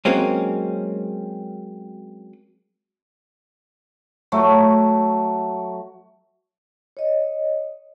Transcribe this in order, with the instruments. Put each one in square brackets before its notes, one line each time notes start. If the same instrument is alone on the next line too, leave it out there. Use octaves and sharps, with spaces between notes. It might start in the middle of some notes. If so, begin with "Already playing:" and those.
[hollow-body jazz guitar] F#3 G#3 A#3 C4 C#4
[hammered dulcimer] F#3 A3
[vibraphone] C#5 D#5